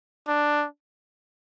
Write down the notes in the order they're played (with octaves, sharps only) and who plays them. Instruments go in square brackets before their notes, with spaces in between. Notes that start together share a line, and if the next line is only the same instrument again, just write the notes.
[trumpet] D4